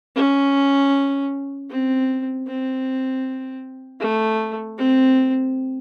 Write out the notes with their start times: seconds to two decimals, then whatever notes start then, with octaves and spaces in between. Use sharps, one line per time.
0.15 C#4
1.70 C4
2.47 C4
4.00 A3
4.78 C4